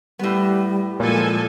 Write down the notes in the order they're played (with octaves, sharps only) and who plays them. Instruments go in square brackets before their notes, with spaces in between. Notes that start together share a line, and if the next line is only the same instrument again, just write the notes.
[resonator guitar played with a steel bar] A2 B3 [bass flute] G3
[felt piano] A#2 [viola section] F3 A4 G#5 [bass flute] G#3